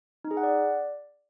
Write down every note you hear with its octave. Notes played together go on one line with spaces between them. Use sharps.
D#4
G#4
F#5
D5